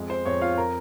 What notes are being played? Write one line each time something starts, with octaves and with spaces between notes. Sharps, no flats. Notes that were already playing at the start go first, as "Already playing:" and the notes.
Already playing: F2 G#3
C5
F2 C#5
F4 F5
A#4 A#5